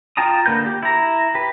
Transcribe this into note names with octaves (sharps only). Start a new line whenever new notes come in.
F4 G5 A5 A#5 D#6
D3 A#3 B4 G6
G4
E4 A#5
G4 B4